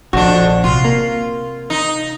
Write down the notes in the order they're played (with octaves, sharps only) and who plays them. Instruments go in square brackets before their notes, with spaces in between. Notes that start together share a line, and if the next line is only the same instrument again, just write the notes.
[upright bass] A#1 [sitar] F2 D4 [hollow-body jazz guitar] F#4
[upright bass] C3 [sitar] F4
[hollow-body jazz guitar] A#3
[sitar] D#4